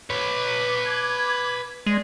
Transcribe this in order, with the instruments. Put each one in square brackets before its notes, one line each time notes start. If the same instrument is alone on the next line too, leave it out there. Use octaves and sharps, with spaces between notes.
[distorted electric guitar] B4 C#5 [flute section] D6
[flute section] D6 G#6
[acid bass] G#3 [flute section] D5 C6